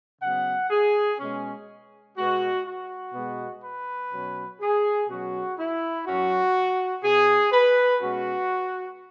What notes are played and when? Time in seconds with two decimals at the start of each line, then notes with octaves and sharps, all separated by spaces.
0.21 C#3 F#3 B3 F#5
0.70 G#4
1.19 B2 G#3 C#4
2.16 B2 G#3 B3 F#4
2.65 F#4
3.13 B2 G#3 B3
3.63 B4
4.12 B2 F#3 C#4
4.61 G#4
5.08 B2 F#3 C#4 F#4
5.58 E4
6.06 F#2 F#3 C#4 F#4
7.03 B2 B3 G#4
7.52 B4
8.02 B2 G#3 C#4 F#4